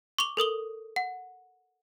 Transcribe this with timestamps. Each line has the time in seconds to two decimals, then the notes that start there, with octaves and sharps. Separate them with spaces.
0.19 C#6 D6 F7 G7
0.37 A4 A#4 D#6 G7
0.96 F#5